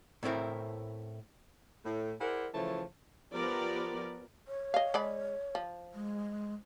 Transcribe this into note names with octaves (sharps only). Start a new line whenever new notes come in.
A2 A3 C4 E4 A#4
A2
E4 G#4 A#4 C5 D5 F#5
C#3 E3 F3 A3 C#5 A5
F3 B3 G4 A#4 D5
C#5
D#5 F5
G#3 D5 B5
F3
G#3